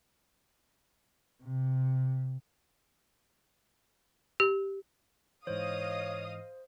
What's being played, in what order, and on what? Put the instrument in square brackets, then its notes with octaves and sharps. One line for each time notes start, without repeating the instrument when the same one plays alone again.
[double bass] C3
[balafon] G4
[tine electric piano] G#2 E3 [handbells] C5 [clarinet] C#5 [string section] D#5 F5 D#6